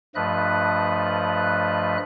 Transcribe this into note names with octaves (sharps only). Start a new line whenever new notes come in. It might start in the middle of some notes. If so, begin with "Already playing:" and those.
G2 F3 A3 B4 D#5 F#6